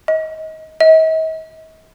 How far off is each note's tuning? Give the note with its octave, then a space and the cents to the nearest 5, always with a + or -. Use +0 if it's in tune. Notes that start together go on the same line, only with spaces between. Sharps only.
D#5 +25
D#5 +45